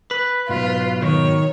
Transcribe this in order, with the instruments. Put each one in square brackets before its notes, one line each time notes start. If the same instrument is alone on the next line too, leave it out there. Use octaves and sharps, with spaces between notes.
[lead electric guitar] B4
[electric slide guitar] G#2 B2 F#3 [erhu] F4
[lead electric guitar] D#3 [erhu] C#5